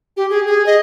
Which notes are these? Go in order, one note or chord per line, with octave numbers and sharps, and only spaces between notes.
G4
G#4
G#4
D#5